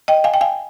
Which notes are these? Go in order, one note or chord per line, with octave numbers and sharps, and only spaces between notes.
D#5 G5
F5 G#5
G5
F5 G#5